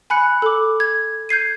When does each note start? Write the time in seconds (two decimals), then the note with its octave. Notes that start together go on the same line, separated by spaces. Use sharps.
0.10 G#5 B5 F#6 C#7
0.42 A4 D6
0.80 G#6
1.29 G6 G#6 C7 D#7